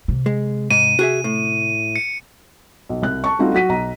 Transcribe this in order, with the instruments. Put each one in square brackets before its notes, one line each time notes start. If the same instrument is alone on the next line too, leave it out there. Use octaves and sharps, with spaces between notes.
[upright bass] C3
[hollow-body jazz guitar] G#3
[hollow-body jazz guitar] G#2 [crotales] D#7
[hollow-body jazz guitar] F#4 G#4 E5
A2
[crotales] C#7
[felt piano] B1
C2 F#6
A5 C#6
G3 A3 C4 D#4 F4 F#4
F#3 F#4 B6 D#7
B1 A#5